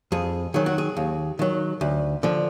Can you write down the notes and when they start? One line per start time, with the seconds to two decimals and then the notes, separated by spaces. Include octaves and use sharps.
0.12 F2 G#4
0.54 D#3 F#3 G#4
0.66 F#4
0.78 G#4
0.97 D#2
1.39 D#3 F#3
1.81 D2
2.23 D3 F3